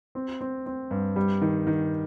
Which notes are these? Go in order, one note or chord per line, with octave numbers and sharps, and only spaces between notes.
C4
C4
C4
G2
G3
D#3
D#3